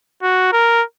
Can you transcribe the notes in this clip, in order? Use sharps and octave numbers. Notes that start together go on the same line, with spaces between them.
F#4
A#4